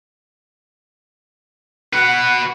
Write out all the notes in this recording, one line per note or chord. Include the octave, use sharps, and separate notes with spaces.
F#4 B4 F#5